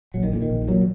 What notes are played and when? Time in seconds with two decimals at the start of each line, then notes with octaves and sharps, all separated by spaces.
0.14 A#1 F#3
0.23 D#3
0.32 A#2 D3
0.42 D#3
0.50 A#1
0.68 A#2 F#3